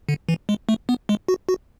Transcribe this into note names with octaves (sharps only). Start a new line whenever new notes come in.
D3
E3
G#3
A3
B3
G#3
F#4
F#4